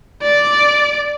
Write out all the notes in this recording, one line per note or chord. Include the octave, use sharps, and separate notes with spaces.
D5